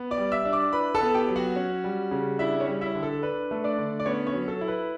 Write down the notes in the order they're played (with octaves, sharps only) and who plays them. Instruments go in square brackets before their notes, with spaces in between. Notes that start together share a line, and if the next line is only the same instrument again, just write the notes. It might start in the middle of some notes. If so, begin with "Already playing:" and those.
Already playing: [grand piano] B3
D5 D6
G3
E5 E6
D4
D5 D6
E4 B4 B5
A4 A5
B3
G4 G5
F#3
F#4 F#5
C#4
G3
C#3
D4 E4 E5
C#4 C#5
G3
E4 E5
D3
A4
D4 B4
A3
D4 D5
D3
D5
B3 C#4 C#5
C#4 C#5
F#3
A4
E4
B4